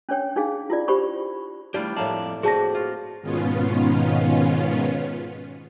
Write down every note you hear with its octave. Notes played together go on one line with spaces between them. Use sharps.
C#4 D4 C#5 G5
D4 D#4 G#4 F5
E4 F4 D5
G4 C5 B5 C#6
G3 A3 D4 E4 F4 G4
F2 A2 A#3 D5 F5 A5
C4 D4 F#4 G#4 A5 A#6
F4
G#2 B2 D#3 B3 C#4 F4